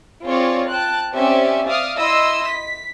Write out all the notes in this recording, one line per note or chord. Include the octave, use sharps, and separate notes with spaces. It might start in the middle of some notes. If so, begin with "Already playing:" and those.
C4 F4 G#4 C#5 D5
G5 A5 F#6
C4 C#4 G4 D5 E5 G#5
D5 E5 F5 D#6 F6
E4 D#5 C6 E6
B6